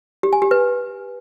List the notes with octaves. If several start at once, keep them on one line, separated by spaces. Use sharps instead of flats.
G4
G#5
G4
B4